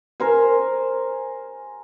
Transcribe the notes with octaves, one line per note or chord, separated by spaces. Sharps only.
A#4 C5 G#5